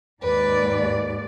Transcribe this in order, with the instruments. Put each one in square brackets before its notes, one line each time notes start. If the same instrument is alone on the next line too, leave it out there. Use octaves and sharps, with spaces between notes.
[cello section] D#2 G#2 D5 [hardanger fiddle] B4